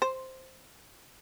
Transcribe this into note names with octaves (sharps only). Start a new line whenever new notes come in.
C5